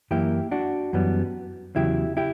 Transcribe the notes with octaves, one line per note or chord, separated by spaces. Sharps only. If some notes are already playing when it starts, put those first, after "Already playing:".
F#2 E3 A#3 E4 G4
D4 F#4
F#2 E3 G3 B3
E2 C#3 F#3 E4 G4
E4 G4